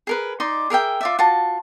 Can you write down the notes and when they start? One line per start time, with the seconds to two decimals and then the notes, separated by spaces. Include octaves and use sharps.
0.07 G#4 A#4 B4
0.40 D#4 D5 C6
0.70 G#4 A#4 E5 G5
1.01 F4 D5 E5
1.19 F4 F#4 A5